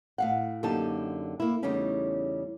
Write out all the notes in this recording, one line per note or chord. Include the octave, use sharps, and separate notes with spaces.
A2 F5 F#5
F#2 D3 A#3 D#4 G4 A5
A#3 E4
E2 C#3 G3 A3 C#4 D#4